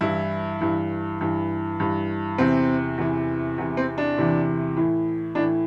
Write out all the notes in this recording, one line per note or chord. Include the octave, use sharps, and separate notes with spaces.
G2 E3 E4
G2 E3
G2 E3
G2 E3
E2 C3 E3 C4
E2 C3 E3
E2 C3 E3
C4
D4
E2 C3 E3
A2 E3
A2 E3 D4